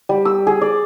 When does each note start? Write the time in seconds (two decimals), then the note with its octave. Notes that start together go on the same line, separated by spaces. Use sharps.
0.09 G3
0.25 E6
0.47 G#4
0.61 D5